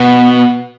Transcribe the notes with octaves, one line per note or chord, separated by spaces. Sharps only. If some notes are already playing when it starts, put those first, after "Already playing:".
Already playing: B2 B3